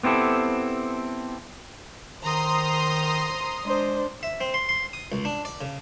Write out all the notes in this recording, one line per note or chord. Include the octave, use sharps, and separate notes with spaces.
B3 C4 E4 G4 A4
D#3 C5 A#5 C6 D#6
G#3 D4 C5
E5
C4
C6
C6
D#6
C#2
D4
D5
C#3